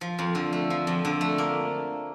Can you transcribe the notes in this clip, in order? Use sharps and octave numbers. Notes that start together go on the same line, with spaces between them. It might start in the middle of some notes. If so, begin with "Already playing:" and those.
F3
F2
D3
A3
F3
F2
D3
A3
A#3